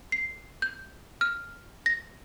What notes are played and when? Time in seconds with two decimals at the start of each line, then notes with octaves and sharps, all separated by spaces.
0.12 C7
0.62 G6
1.21 F6
1.86 A#6